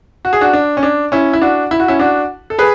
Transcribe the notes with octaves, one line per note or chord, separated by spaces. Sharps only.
F#4
G#4
D4 F#4
D4
C#4
D4
C#4 E4
E4
D4 F#4
E4
F#4
C#4 E4
D4 F#4
A4
G#4 B4